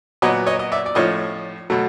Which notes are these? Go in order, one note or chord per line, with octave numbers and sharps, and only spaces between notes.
A#2 F#3 B3 C#5 D#5
C#5 D#5
D#5
D5 E5
D5
A2 F3 A3 C#4 C#5 D#5
B2 F#3 A3